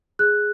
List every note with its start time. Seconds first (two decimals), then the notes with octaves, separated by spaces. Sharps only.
0.19 G#4 F#6